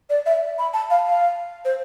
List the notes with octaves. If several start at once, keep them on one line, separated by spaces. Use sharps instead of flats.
D5
E5
B5
A5
F5
F5
C5